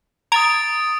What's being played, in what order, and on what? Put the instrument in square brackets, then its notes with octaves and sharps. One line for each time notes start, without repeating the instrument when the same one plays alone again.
[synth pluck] A#5 G#6 [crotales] D#6 A6 D7